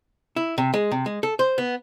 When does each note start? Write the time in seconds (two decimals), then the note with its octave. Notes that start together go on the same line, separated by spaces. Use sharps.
0.36 E4
0.58 C3
0.74 G#3
0.91 C3
1.06 G#3
1.23 A4
1.39 C5
1.58 B3